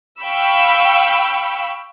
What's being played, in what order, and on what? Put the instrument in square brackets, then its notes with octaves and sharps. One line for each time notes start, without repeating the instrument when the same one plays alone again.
[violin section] F5 G5 B5 C#6 E6